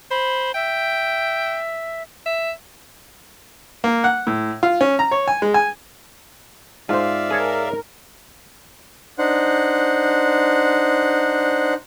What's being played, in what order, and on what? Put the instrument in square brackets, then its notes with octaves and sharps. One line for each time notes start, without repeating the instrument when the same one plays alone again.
[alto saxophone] C5 [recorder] B5
[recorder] E5 [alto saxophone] G5
[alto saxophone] E5
[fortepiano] A#3
F#5
A2
F4
C#4
A#5
C#5
G#5
G#3
G#5
[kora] G#2 C5 [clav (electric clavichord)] F4 [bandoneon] D5 E5 F5
[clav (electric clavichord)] G#4 C#5 A5 [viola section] A#4
[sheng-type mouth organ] D4 D#4 C5 F#5